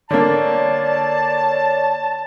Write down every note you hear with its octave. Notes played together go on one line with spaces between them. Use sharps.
D3 A#3 C#5 D5 A5